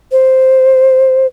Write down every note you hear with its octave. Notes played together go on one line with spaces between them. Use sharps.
C5